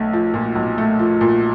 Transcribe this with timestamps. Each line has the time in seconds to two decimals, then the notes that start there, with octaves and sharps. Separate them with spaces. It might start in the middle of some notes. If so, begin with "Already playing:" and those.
Already playing: B1 A3
0.13 F3
0.34 A#2
0.55 B1
0.78 A3
0.99 F3
1.21 A#2